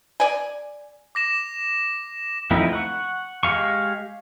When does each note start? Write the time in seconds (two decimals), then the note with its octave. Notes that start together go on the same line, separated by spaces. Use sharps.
0.20 D5 G#5
1.15 D6 A#6 E7
2.51 F3 A3 C4 D#4 E4
2.73 F#5 C#6
3.43 G#3 G4 F5 C#6